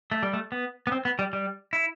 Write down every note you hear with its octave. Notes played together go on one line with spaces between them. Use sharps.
A3
G3
A3
B3
B3
C4
B3
G3
G3
E4